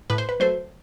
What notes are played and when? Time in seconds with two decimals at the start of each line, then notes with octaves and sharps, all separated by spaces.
0.10 A2 B4
0.18 C5
0.29 B4
0.40 F#3 A3 C5